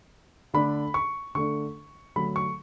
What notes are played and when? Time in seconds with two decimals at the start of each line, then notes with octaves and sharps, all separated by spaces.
0.54 D3 A3 D4 B5
0.94 C#6
1.35 D3 A3 D4 C#6
2.16 D3 F#3 A3 B5
2.36 C#6